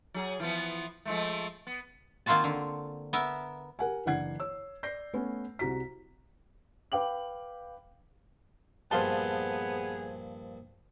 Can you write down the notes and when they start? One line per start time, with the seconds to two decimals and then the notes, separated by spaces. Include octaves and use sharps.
0.14 F#3 G#4
0.40 E3 F3 B3
1.05 F3 G#3 A3
1.67 B3
2.26 D#3 A#3 C4 F4 F#4 A5
2.44 D3
3.13 B3 A#4 E5
3.79 G4 A#4 F#5 G#5
4.06 F#1 E3 D4 F#5 G#6 C7
4.40 C#5 E6
4.83 D5 G6 A#6 C7
5.13 A3 B3 C#4
5.59 C2 C3 F#4 A#5 B6
6.92 B4 F5 G5 D6 F#7
8.91 A#1 G2 B3 G#4 C5 F5 A5 C6